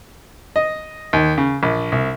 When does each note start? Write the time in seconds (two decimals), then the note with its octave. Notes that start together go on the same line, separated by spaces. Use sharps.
0.56 D#5
1.13 D#2
1.38 C#3
1.63 A#1
1.92 C2